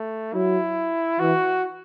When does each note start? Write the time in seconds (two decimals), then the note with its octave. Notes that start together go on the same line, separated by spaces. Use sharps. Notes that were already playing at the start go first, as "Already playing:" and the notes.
Already playing: A3
0.34 F#3 E4
1.19 E3 F#4